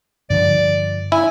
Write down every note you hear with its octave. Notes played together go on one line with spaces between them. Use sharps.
G2 D3 F3 D5
E4 G#5